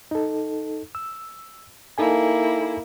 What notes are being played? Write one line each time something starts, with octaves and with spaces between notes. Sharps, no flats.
D#4 A4
E6
A#3 D#4 E4 A4 G#5